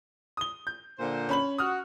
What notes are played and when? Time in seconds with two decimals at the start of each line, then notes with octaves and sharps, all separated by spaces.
0.37 D#6 G7
0.67 G6
0.99 A#2 D3 C5
1.29 C#4 B5 F#7
1.58 F#4 D#6 F6